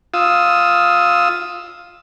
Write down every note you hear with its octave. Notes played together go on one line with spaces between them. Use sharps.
F4 D#6 E6